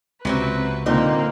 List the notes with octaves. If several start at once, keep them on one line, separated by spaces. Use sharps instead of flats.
C#2 C3 F#3 C4 B4
A#2 D3 A#3 C4 D#4 C5